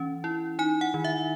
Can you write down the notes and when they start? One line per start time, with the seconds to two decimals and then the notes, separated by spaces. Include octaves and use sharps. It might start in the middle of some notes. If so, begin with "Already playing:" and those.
Already playing: E3 C#4
0.24 E4
0.59 D#4 G#5
0.81 F#5
0.94 D#3
1.04 E5